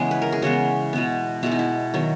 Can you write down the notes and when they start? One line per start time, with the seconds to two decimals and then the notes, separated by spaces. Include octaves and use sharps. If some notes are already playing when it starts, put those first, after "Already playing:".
Already playing: C#3 E3 G#3 B3 G#4
0.11 B4
0.22 A#4
0.33 G#4
0.42 C#3 E3 G#3 B3 F#4
0.93 B2 G#3 B3
1.43 B2 G#3 B3 E4
1.52 D#4
1.59 E4
1.94 D#3 F#3 B3